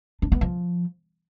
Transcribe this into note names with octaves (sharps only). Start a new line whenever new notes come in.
D4
B3
F3